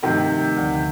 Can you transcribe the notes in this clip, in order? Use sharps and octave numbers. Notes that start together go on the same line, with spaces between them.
G2 C3 D#3 F3 A3
D2 D3 F3